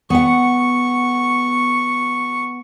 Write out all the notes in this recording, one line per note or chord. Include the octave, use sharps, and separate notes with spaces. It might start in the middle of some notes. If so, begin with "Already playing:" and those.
B3 F#5 C#6